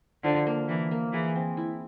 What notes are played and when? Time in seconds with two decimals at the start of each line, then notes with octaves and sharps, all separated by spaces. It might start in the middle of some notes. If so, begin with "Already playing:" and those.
0.24 D3 F3
0.47 A#3
0.69 E3 A#3
0.91 A#3
1.13 E3 G#4
1.36 C4
1.57 E4